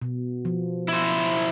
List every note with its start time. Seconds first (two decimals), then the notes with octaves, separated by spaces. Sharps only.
0.02 B2
0.45 F3
0.88 E4 C5